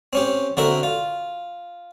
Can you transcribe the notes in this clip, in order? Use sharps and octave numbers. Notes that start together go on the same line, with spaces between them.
C4 C#4 G4
D3 C4 F#4 A#4 E5
F4